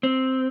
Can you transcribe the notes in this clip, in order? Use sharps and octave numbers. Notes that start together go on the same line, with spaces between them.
C4